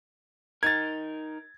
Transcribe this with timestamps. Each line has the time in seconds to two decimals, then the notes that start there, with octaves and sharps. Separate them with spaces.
0.63 D#4 A#4 G#6 A6